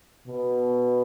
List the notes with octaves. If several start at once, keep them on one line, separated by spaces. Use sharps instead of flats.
B2